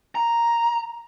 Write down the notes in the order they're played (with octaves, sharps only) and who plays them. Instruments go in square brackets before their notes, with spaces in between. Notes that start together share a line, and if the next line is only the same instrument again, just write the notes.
[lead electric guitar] A#5